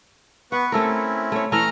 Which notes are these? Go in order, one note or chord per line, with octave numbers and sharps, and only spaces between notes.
B3 B4 F#5 C#6
A3 C4 C#4 E4 A4 A#4
A3 C#5
E3 A3 C#4 A#5 F6